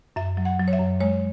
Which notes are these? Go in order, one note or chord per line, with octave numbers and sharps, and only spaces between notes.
F#2 E5
F#3
F#5
F#3
C#5
E5
F#2
G#3 C#5